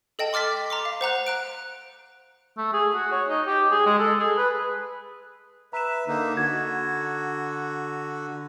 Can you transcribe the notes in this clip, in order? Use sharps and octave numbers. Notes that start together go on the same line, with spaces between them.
A4 D#5 G5 A5
C6 D6 F6 A6 B6
A#5 C6 D6
F5
C5 F#5 A#5 F#6
A#5 F#6 D7
A3
G#4
F#4
C#5
D#4
G4
G#4
G#3
A4
G#4
B4
B4 E5 A#5 E7
D3 A#3 D#4
D3 F#4 G#6